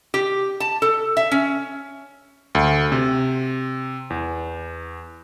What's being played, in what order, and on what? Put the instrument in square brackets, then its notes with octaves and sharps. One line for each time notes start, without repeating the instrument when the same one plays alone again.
[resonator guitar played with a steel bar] G4
A5
A4
E5
C#4
[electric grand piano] D2
C3
E2